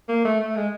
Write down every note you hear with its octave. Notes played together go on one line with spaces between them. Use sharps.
A#3
A3
A3
G#3